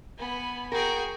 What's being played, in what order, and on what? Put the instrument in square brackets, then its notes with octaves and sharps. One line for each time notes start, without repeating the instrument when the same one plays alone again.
[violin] B3 [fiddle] G#5 B5
[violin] F#4 G#4 [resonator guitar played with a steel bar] A#4 [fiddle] G5